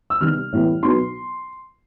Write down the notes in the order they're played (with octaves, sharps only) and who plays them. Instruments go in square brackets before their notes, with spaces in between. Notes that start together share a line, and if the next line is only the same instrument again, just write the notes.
[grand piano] E6
C3 D#3 G3 B3 D#4 F6
A2 E3 G3 B3
B2 F#3 B3 D#4 C6